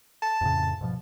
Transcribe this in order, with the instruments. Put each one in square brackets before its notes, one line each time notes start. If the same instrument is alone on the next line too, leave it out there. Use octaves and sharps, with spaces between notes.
[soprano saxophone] A5
[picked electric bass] F2 A2 C#3
G#2 B2 F3